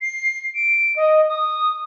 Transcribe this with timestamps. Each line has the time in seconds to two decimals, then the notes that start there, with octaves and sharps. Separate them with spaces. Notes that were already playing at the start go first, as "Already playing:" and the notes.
0.01 C7
0.55 D7
0.96 D#5
1.29 D#6